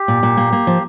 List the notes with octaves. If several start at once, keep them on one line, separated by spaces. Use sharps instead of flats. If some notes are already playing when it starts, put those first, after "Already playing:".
Already playing: G4
A#2
A#2
A#3
A#3
F3